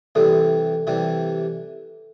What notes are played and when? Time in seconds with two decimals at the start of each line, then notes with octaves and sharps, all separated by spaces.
0.15 C3 E3 G3 A4
0.87 C3 E3 G3